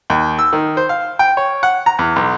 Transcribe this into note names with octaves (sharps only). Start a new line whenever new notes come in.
D#2
E6
D#3
C5
F5
G5
C#5
F#5
A#5
E2
B1